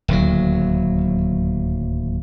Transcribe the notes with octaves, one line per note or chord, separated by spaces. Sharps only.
D1 D#2 F#3